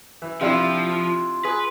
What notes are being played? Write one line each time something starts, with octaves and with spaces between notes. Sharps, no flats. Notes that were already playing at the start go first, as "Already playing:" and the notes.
E3
C3 F3 D4 E4 F4 G5 E6
G#4 B4